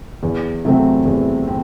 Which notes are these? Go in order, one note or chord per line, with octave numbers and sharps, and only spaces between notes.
E2
C3 F#3 A3 C4
E2
C4